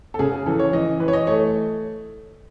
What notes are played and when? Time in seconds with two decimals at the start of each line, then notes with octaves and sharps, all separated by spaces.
0.14 A4
0.19 C#3 G#4
0.32 G#4
0.46 E3 A4
0.59 C#5
0.73 E3 D#5
1.00 E3 B4
1.08 C#5
1.13 D#5
1.27 A3 C#5